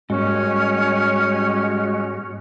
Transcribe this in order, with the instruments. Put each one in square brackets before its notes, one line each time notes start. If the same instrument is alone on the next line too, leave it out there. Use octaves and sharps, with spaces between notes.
[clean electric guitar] G#2 A#3 [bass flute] G3 [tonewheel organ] G#3 F#4 [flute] C#4